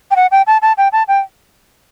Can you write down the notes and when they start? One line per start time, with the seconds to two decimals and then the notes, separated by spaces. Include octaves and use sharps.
0.11 G5
0.16 F#5
0.31 G5
0.47 A5
0.62 A5
0.77 G5
0.92 A5
1.08 G5